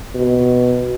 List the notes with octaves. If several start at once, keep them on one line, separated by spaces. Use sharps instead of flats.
B2